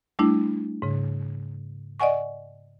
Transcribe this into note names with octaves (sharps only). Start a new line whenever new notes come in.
G3 A3 D4 E4
G#2 C#3
D5 D#5 F#5 G#5 C#6